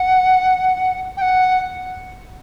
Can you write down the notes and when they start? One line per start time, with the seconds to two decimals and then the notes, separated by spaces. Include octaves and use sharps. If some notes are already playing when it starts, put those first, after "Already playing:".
Already playing: F#5
1.17 G5
1.21 F#5